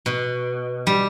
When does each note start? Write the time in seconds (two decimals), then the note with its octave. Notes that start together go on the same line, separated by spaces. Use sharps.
0.06 B2
0.87 G3